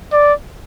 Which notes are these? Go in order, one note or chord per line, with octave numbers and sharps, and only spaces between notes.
D5